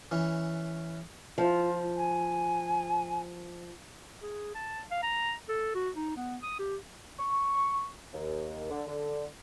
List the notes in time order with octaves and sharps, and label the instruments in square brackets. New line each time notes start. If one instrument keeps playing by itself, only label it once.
[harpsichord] E3 C#4
[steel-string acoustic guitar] F3 [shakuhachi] F4
[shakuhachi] G#5
[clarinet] G#4
A5
F5
A#5
A4
F#4
D#4
B3
D#6
G4
[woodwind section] C#6
D#2
D3
D3